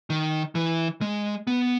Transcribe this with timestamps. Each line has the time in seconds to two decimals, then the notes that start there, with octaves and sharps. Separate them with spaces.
0.10 D#3
0.55 E3
1.01 G#3
1.47 B3